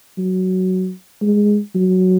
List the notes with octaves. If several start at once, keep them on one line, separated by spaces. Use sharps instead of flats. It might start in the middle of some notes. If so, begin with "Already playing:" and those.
F#3
G#3
F#3